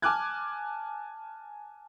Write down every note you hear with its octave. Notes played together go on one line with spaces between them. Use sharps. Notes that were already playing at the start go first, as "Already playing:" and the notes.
G#5 A5 D6 F6 F#6 G#6